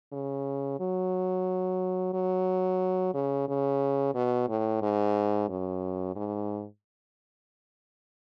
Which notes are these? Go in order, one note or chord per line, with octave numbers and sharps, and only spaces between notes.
C#3
F#3
F#3
C#3
C#3
B2
A2
G#2
F#2
G#2